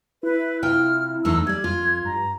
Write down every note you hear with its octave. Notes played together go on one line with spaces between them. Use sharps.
E4 B4
C3 F4 G5 F6
E2 A3 D#4 E6
G3 A3 D5 G#6
F2 F4
G2 A#5